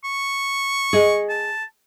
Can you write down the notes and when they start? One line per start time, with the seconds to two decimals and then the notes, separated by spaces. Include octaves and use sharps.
0.04 C#6
0.93 G#4 D#5
1.29 A5